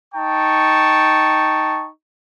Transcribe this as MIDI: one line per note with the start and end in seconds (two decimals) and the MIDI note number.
0.13 1.87 63
0.13 1.87 79
0.13 1.87 81
0.13 1.87 85